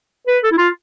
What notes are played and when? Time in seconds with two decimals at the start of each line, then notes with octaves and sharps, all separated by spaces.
0.27 B4
0.43 A4
0.51 E4
0.58 F4